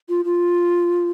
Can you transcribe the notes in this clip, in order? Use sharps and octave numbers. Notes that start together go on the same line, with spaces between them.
F4
F4